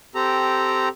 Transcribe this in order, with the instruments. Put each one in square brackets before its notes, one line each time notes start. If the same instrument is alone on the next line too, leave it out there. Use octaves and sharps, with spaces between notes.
[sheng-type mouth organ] C4 G4 A4 A#5